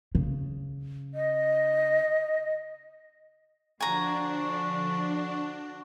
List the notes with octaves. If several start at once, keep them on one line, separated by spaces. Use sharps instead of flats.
C#3
D#5
D3 F3 D4 F#4 G#5 A#5